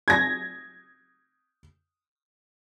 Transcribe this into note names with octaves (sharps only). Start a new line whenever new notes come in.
G#6 A#6